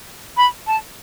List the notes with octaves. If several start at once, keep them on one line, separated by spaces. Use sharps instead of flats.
B5
A5